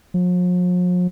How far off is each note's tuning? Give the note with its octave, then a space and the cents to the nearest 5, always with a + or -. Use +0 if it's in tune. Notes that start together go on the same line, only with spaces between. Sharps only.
F3 +45